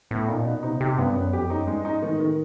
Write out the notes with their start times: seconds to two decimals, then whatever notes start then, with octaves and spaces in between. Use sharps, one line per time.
0.11 A2 B3
0.28 A#2 D#4
0.45 B2 B3
0.63 C3 D#4
0.80 C3 G4
0.98 G2 B3
1.15 F#2 B3
1.33 F2 G4
1.50 F#2 D#4
1.67 G2 G#3
1.84 G#2 D#4
2.02 A2 D#3
2.20 D#3